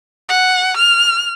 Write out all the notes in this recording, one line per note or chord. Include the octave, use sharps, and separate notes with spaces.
F#5
F6